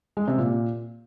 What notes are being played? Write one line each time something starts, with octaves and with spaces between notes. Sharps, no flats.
G#3
C3
A#2